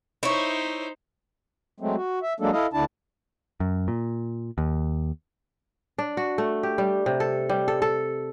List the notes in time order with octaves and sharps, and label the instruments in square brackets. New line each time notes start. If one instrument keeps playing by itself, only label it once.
[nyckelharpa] D#4 C5 [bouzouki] E4 C#5
[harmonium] F#3 G#3 A3 C4
F#4
E5
F#3 G#3 A#3 D4 A4
E4 A4 D#5 F5
D2 D3 D4 E4 A5
[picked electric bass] F#2
A#2
D#2
[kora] D4
F#4
A3
G4
G3
C3
A4
G3
A4
A4